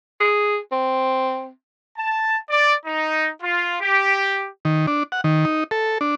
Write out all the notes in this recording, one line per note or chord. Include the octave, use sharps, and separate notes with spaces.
G#4
C4
A5
D5
D#4
F4
G4
D#3
D4
F#5
D#3
D#4
A4
D4